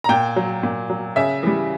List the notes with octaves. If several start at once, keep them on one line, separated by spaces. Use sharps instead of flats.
A#5
A#2 G5
F#3
A#2
F#3
C#3 E5
E3 G3